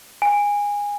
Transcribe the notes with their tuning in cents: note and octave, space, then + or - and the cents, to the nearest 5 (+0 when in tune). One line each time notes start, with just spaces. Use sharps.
G#5 -20